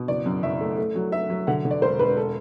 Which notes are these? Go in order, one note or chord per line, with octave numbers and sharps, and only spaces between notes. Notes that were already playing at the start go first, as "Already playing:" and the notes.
Already playing: B2
F#1 D5
F#2
F#1 E5
A3
A3
F#3
A3 E5
F#3
D3 F#5
D3
D5
E1 C5
E1 B4
A4